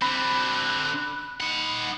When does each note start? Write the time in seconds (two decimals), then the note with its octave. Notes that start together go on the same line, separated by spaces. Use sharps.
0.02 D3 C4 B5 F#6
1.40 D#4 F#5 B5